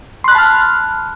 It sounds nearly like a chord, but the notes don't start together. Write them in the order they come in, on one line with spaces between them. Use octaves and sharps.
C6 F#6 B5 A5 F6